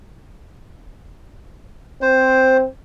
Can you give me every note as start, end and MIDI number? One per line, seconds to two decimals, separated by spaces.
2.02 2.65 60
2.02 2.57 72